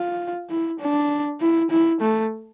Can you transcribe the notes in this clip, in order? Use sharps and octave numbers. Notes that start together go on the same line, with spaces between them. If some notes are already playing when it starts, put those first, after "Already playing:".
Already playing: F4
E4
D4
E4
E4
A3